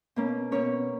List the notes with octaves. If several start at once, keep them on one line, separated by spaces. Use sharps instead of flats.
B2 A#3 C#4
B2 A#3 C#4 C#5